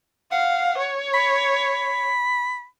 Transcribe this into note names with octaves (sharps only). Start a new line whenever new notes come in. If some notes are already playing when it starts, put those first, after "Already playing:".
F5 F#5
C#5
B5